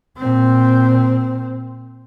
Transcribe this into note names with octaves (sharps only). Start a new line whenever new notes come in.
A#2 C4